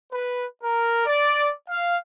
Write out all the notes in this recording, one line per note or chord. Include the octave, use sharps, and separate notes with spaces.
B4
A#4
D5
F5